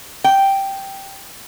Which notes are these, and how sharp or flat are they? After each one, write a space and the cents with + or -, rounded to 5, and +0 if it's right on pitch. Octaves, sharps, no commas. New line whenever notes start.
G5 -5